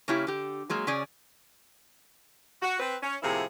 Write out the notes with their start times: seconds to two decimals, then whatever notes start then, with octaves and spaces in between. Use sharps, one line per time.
0.08 C#3 A#3 C#4 E4 G4
0.27 D3 G4
0.70 F#3 G#3 A#3
0.87 C#3 C#4 G#4 D5
2.62 F#4
2.80 C4 B4
3.02 C#4
3.22 A2 C3 F3 A#3 E4 G#4